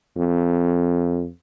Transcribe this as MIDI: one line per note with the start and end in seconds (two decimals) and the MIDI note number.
0.17 1.28 41